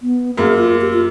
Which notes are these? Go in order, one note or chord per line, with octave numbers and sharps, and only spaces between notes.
B3
F#2 A#3 G#4
F4
G4
F4